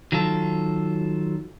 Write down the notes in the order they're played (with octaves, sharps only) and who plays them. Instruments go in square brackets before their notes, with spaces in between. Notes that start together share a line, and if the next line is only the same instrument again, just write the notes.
[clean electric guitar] D#3 F#3 F4 A4